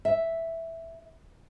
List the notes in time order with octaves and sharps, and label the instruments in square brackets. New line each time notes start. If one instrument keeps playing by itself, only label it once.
[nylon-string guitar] E5